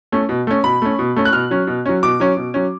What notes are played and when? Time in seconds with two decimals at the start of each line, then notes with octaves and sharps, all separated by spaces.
0.12 A3 C#4
0.29 B2
0.47 A3 C#4
0.64 B2 B5
0.82 A3 C#4
0.99 B2
1.16 A3 C#4
1.25 F#6
1.33 B2 F6
1.51 F#3 C#4
1.67 B2
1.86 F#3 C#4
2.03 B2 D6
2.20 F#3 C#4
2.37 B2
2.54 F#3 C#4